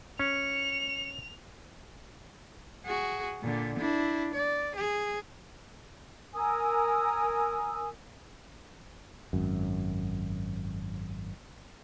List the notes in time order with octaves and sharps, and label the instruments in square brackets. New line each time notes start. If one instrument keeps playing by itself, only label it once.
[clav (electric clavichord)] C#4 [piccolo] C#7 [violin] F7
[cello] F#4 G#4
A#2 D3
D4 E4
D5
G#4
[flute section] A#4 G#5 D#6 E6
[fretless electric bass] G#1 F#2